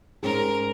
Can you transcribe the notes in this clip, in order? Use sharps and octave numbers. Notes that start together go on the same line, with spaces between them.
G#2 G#3 C#4 G#4 A#4